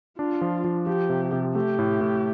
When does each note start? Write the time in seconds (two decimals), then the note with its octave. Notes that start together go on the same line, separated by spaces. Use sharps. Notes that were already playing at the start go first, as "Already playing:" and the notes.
0.19 D4 F4
0.42 F3
0.64 F3
0.87 F3 G4
1.09 C3
1.32 C3
1.55 A3 G4
1.79 A2
2.01 A2